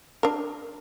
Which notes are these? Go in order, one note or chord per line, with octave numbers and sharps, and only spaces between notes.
D4 A#4